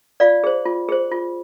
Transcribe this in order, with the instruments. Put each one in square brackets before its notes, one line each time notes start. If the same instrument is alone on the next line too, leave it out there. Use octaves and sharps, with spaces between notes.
[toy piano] F4 D5 F5
G#4 C5
F4
G#4 C5
F4